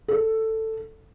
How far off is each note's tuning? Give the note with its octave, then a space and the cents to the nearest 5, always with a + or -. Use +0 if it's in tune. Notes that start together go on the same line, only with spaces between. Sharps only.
A4 +10